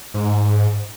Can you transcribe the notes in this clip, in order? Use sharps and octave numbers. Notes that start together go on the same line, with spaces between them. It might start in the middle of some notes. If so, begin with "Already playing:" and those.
G#2